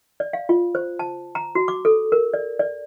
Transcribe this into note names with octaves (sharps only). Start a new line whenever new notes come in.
D5
F5
F4
C5
A5
A#5
F#4
D6
A4
A#4
D5
D5